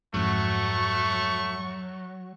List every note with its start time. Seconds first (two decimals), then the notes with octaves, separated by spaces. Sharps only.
0.14 F2 G#2 F#3 A3 C#6